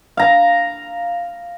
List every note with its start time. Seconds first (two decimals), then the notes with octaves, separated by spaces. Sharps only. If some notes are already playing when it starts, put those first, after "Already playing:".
0.17 F5 A#5